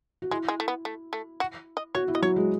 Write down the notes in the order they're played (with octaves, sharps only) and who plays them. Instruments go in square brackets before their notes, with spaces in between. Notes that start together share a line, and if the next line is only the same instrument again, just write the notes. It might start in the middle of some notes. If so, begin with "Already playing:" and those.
[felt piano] F#4
[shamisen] G#3 [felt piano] E4
[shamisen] G#3
A3
B3
A3
A3
F#4
D#5
[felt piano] F#4 [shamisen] C#5
[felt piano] E4
[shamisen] D#5
[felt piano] F#3 [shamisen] C#5
[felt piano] G#3